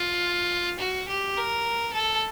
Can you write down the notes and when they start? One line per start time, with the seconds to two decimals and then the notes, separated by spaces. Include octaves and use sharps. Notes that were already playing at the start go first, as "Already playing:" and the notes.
Already playing: F4
0.79 F#4
1.09 G4
1.37 A#4
1.93 A4